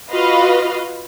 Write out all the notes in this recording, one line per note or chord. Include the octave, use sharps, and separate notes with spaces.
F4 F#4 B4 D#5 F5